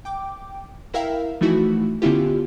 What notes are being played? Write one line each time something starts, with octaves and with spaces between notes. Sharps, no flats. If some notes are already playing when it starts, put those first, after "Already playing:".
G5 D6
E4 A#4 E5 F5 G5
E3 F3 A3 D#4 E4 F#4
D3 B3 C#4 E4 F4 G4